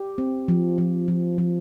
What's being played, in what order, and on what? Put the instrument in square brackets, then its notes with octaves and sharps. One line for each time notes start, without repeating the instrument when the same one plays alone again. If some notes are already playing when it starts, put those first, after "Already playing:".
Already playing: [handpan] G4
C4
F3
F3
F3
F3